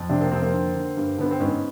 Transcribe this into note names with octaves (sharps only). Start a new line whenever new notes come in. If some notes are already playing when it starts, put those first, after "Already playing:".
Already playing: F2
C3 C4 D4
A#3 C4
F2 A#3 C4
A#3 C4
D3
D3
G2
D3 B3
C4
G#2 B3 C#4